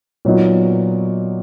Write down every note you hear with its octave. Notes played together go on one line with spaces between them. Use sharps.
A#2 F#3 B3 D#4 F#4